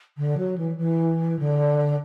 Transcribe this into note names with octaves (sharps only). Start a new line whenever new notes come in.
D3
F#3
E3
E3
D3